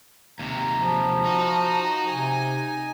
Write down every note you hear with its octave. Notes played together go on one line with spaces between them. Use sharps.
D#2 C3 A#5
F3
D#4 F#4
C3 G#5